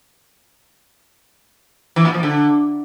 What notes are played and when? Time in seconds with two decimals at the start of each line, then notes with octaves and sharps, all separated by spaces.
1.96 E3
2.05 A#2
2.14 F3
2.23 D3